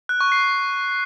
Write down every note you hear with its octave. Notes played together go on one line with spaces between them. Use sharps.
F#6
C#6
C7